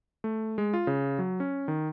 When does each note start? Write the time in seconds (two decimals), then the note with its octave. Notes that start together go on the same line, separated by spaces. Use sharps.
0.24 A3
0.58 G#3
0.74 F4
0.87 C#3
1.19 F#3
1.40 C#4
1.68 D#3